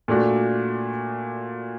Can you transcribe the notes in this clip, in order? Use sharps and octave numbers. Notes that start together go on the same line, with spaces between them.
A#2 A3 D4 F#4